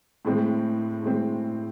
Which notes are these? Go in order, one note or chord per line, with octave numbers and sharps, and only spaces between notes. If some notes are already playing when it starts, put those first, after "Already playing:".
A2 G#3 C4
A2 G#3 C4